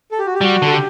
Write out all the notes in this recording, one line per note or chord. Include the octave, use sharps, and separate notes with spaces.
A4
G4
F#4
G4
G3 F#4
D3 A4
G4